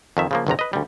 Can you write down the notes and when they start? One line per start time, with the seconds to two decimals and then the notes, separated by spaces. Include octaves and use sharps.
0.17 F2 D#3 E5
0.31 C#3 F3 A#3
0.47 G1 E2 C3 A#5
0.59 B4 D#5
0.73 D2 G3